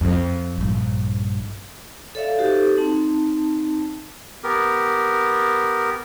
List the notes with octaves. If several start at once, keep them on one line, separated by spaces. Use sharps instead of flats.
F2
A#1 G2
A4 C#5 D5 E5 F5
D#4 F#4 G4 A4 C5
C4 D#4 A5
B3 G4 A#4